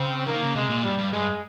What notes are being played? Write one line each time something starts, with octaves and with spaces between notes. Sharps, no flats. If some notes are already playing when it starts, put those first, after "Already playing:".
Already playing: C#3 C4
D#3 A#3
C#3
C3 G#3
A#2
G2 G3
G2
G2 G#3